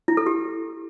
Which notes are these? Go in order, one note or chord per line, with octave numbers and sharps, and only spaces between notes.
E4
A4
G4